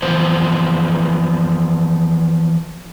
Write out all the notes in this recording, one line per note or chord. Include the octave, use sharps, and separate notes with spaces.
E3 F3 B3 C5